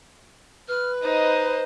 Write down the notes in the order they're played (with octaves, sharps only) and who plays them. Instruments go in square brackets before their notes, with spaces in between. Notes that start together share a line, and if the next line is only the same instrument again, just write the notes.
[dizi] B4 [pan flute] F6
[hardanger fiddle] D#4 D#5 [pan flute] C5